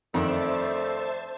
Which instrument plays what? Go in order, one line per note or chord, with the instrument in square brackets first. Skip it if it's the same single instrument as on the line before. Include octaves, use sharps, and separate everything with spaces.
[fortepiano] F2 [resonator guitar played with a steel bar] D#3 D4 [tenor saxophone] A3 [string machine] C5 E5 A5